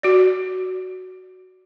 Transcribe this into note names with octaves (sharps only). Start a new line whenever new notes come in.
F#4 D5